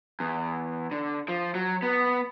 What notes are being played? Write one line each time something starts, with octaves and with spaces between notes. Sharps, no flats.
E2
D3
F3
F#3
B3